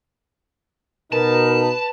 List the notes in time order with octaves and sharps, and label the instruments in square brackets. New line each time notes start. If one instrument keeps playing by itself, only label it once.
[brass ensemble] B2 D#4 [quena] A#4 [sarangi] B4 [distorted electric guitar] A5